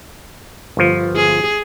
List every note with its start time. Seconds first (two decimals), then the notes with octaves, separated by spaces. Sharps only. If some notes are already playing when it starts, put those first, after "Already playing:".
0.77 G1 F3
1.16 G#4